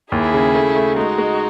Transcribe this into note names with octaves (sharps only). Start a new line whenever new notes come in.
D#2 E4 G#4
C#3
A3
A3
G#3 D#4 F#4
G#3